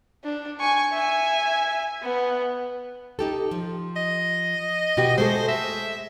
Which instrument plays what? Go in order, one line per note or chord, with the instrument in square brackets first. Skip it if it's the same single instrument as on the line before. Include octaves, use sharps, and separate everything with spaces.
[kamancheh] D4
G#5 C#6
E5 G#5
B3
[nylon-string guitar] D#4 G4 A4
F3
[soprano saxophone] D#5
[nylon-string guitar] B2 F#4 G4
[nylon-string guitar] G#3 A3 A4 [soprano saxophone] C5
[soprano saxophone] E5